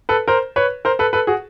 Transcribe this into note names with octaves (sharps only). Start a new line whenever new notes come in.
A4 B4
A#4 C5
B4 C#5
A#4 C5
A4 B4
A4 B4
F#4 G#4